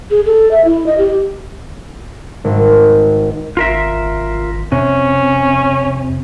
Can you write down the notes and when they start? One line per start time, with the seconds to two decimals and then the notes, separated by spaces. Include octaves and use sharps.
0.11 G#4
0.26 A4
0.51 E5
0.65 E4
0.86 D#5
0.98 G4
2.44 G#1
3.57 G#1 F4 A#4 E5
4.72 F2 C3 C#4